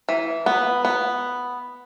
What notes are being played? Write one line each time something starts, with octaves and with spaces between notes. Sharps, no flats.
E3
B3
B3